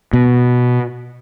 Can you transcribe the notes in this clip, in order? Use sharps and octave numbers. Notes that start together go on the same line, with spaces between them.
B2